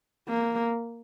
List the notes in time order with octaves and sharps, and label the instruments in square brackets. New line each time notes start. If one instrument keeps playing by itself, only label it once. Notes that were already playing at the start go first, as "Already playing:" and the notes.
[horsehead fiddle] A#3